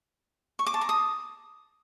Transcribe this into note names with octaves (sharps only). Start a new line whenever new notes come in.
C#6
D6
A5
A#5
D#6